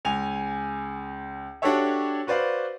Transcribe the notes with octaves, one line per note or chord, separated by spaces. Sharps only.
C#2 G#5 F7
D4 F#4 G4 A4 C#5 E5
F#4 B4 C5 D5 F5